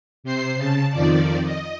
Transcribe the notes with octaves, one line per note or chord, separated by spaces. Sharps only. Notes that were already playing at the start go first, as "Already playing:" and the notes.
C3 C5 C7
C#3 A5
F2 D#3 F3 D5
D#5